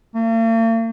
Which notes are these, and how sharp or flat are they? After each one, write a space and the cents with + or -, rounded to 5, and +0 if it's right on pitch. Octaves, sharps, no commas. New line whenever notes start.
A#3 -45